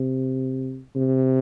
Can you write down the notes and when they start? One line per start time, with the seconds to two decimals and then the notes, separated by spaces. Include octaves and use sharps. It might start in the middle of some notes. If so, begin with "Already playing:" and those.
Already playing: C3
0.95 C3